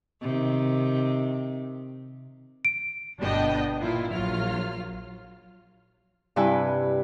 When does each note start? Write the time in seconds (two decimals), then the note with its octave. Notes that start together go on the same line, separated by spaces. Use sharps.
0.22 C3 D#3
2.65 D7
3.19 G1 B2 B3 D4 D#5 G5
3.80 A#2 E4 F4
4.11 A#1 F#3 F4 F6
6.36 G2 C3 E4 B4 G5 G#5